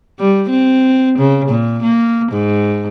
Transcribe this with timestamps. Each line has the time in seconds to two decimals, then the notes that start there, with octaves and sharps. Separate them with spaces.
0.19 G3
0.50 C4
1.18 C#3
1.49 A#2
1.83 A#3
2.32 G#2